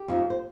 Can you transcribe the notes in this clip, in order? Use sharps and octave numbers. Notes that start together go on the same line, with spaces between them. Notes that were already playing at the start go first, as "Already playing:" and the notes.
Already playing: G4
F2 F3 D#4
C5